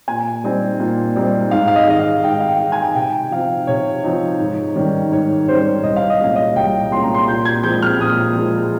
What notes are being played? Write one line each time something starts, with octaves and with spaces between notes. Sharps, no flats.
A#2 G#5
G3 C4 D#4
A#2
G3 C4 D#4
G#2 F5
F5
D#5
D#3 G#3 D#5
F5
G#2 G5
F5
G5
D#3 G#3
G#5
C3 G5
F3 C4 D#4 F5
C3 C#5
F3 C4 D#4
G#2
D#3 G3 C#4
G#2 C#5
D#3 G3 C#4 C5
C2 D#5
F5
D#5
A#2 G#3 C#4 F5
D#5
C2 G5
A#2 G#3 C#4 C6
A#5
C6
A#2 G6
G#6
F3 G#3 C4 G6
F6
A#2 D#6
F3 G#3 C4